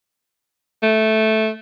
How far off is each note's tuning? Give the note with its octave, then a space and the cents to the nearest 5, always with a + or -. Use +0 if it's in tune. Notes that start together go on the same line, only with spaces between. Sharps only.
A3 -5